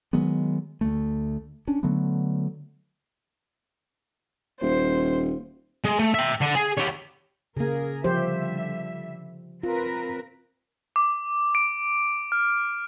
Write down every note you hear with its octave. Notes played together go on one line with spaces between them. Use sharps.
D#3 F#3 G#3 B3
D2 F#3 A3
C#4 D4
D3 F#3 A3 B3
D#1 C5
G#3
A3
E5 G5
D3
G#4
G4 C#5
C#3 A#3 G#4 A#4
D3 F3 G3 G4 C5 E5
C4 F4 A#4 B4
D6
D7
F6